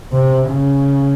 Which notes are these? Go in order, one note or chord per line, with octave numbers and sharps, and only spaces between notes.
C3
C#3